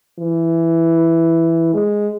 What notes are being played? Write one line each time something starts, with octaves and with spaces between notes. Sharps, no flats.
E3
G#3